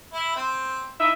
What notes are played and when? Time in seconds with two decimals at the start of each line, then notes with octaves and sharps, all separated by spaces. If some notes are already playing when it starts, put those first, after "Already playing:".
0.13 E4
0.36 C4
1.00 D#4 E4 E5